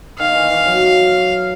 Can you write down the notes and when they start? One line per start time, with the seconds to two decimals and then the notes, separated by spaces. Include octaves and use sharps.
0.19 D#3 F5
0.35 E3
0.51 E3
0.66 F#3